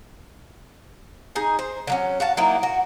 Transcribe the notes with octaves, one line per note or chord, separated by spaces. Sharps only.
D#4 G#4 G#5
C5
D3 F#3 C#4
F#4 F5 A5
F#3 A#3 D#4 E4
F#4